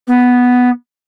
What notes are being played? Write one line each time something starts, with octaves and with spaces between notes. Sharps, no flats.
B3